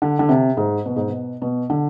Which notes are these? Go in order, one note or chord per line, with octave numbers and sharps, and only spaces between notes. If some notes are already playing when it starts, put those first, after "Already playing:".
D3
D3
C3
G#2
B2
G#2
B2
B2
D3